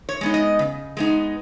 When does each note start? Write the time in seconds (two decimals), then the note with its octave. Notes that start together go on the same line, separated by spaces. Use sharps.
0.09 C#5
0.21 G#3 B3 D#4
0.34 D#5
0.59 C#3
0.97 G#3 B3 D#4